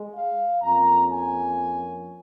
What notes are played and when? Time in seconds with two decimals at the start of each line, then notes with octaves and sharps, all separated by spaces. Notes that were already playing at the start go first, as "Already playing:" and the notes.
Already playing: G#3
0.15 F5
0.62 F2 F3 A#3 C#4 A#5
1.10 G#5